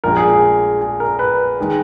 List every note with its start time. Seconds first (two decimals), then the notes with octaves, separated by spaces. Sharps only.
0.04 A#1 A#2 G#3 A#4
0.17 G#4
0.30 G#4
0.81 G#4
1.00 A#4
1.19 B4
1.60 D#3 G#3